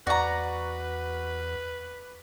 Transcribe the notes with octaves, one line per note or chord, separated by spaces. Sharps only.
E2 F#4 B4 D5 A#5 C#6